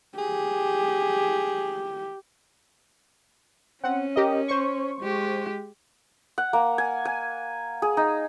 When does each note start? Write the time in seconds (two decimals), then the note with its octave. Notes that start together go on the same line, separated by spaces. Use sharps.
0.18 G4 G#4
3.84 C4 C#4 F#5
4.16 G4 A#4 D#5
4.48 C5 C#6
5.01 G#3 G4
6.38 F#5
6.53 A#3
6.78 G#5
7.05 G#5
7.82 G#4
7.97 D#4